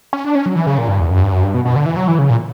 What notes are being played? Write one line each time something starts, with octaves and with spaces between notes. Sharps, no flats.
C#4
D4
C#4
F#3
E3
C#3
A#2
G2
E2
F#2
G2
F#2
G2
B2
B2
D3
E3
F#3
E3
C#3
A#2